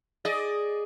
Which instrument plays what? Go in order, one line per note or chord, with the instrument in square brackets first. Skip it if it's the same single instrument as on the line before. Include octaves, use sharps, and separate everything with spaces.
[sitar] G#4 D5 D#5